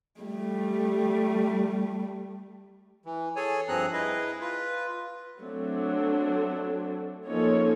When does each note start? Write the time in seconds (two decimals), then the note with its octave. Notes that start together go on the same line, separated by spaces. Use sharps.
0.21 G3 A3
3.05 E3
3.36 G#4 A4 C#5 G#5
3.68 G2 F3 C4 G#4 A#5 F#6
3.93 E4 G#4 B4 D#5
4.40 F4 B4
5.41 F#3 A3 C4 D4 A4
7.28 F3 A#3 C#4 D#4 A4 C#5